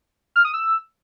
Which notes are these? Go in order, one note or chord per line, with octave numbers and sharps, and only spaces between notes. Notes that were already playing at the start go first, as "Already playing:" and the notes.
F6
D#6
E6